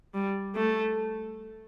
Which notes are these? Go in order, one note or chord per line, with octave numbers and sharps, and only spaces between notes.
G3
A3